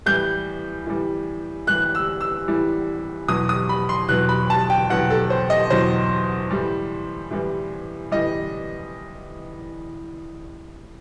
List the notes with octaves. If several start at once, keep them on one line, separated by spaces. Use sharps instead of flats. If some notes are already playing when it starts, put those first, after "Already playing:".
A2 E3 G3 G6
A2 E3 G3
A2 E3 G3 F#6
E6
E6
A2 E3 G3
E2 B2 F#3 D#6
D#6
B5
C6
E2 B2 F#3 F#6
B5
A5
G5
E2 B2 F#3 F#5
A4
C5
D#5
E2 B2 F#3 C5
A2 E3 G3
A2 E3 G3
A2 E3 G3 D#5